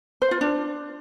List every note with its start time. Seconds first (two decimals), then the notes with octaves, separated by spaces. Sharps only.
0.22 C5
0.31 F4
0.41 D4